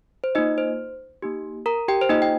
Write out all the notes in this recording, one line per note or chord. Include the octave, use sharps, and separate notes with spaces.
C5
A#3 D#4 F4 D#5
C5
A#3 D#4 G4
A#4 A#5
G4 G5
C5
A#3 D#4 F4 D#5
G5